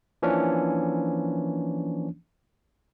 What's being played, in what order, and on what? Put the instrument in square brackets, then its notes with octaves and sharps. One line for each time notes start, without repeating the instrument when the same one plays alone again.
[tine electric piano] E3 F3 A#3 C#4 D4